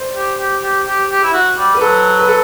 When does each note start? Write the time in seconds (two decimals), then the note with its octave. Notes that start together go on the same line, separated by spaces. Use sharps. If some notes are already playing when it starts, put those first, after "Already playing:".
Already playing: C5 D5
0.15 G4
0.38 G4
0.63 G4
0.86 G4
1.10 G4
1.23 E4
1.33 F#4
1.57 G3
1.75 B4
1.81 F#3 A4
2.19 B4
2.28 A4